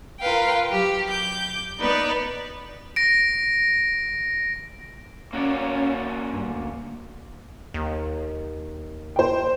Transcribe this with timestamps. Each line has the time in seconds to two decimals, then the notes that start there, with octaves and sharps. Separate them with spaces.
0.21 F4 A#4 B4 F5 G5
0.68 F#3 G4
1.06 D6 G6
1.80 B3 D#4 B4 D5
2.96 A#6 D7
5.33 A#3 C#4 F#4 D5
6.33 G2
6.48 D2
7.74 D#2
9.16 C5 G5